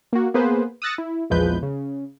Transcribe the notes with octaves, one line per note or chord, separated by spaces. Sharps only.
A#3 F#4
A#3 B3 G#4 B4 C5
D#6 E6 F#6 A6 A#6 C#7
E4
A#1 E2 F3 G#3 B4 G6
C#3